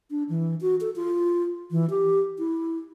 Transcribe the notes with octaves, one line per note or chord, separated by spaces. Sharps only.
D4
E3
F#4
A4
F4
E3
G4
E4